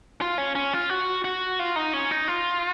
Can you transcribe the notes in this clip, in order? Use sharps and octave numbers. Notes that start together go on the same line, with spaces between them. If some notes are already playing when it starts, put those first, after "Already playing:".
F4
C#4
C#4
F4
F#4
F#4
F4
D#4
C#4
D#4
F4